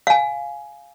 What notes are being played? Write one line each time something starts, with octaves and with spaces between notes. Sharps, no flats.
F5 G#5